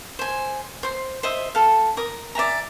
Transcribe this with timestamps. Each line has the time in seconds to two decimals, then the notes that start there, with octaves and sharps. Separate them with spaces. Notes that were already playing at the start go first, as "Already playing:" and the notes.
0.19 C5 G#5
0.83 C5 C6
1.23 C5 D#5 E5
1.55 A4 F5
1.97 A#4 D#6
2.35 D5 E5 G#5 A#5